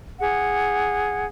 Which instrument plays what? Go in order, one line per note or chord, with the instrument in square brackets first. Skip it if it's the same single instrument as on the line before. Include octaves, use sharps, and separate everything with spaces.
[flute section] G#4 F#5